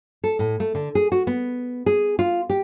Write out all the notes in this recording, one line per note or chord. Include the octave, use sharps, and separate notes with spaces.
A4
A2
A3
D3
G#4
F#4
B3
G#4
F4
G4